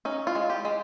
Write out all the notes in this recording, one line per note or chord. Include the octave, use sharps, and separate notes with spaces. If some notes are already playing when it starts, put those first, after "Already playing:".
C#4 D#4
F4
G#3
G4
G#3